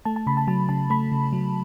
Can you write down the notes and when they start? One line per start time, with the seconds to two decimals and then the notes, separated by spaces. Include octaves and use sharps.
0.05 A3 A5
0.16 A5
0.27 C#3 B5
0.37 A5
0.47 F#3 A5
0.69 C#3 A5
0.90 A3 B5
1.12 C#3
1.33 F#3